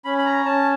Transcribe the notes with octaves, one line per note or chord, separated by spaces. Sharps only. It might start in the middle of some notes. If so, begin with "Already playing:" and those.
C#4 B5
B5
A#5
C#4 A5